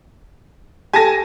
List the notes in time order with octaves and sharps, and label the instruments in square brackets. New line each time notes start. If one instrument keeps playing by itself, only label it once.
[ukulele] G4 A4 [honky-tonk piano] G#5 A5 A#6